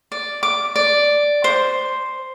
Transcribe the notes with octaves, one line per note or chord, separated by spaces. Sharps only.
D5
D6
D5
C5